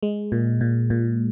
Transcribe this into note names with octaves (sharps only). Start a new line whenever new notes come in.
G#3
A#2
A#2
A#2